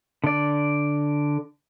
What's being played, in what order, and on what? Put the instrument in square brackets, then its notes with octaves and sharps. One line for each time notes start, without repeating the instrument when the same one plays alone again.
[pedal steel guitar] D3 D5